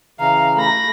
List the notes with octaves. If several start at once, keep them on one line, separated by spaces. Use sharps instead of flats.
C#3 E3 F5 A#5
A3 B5 A#6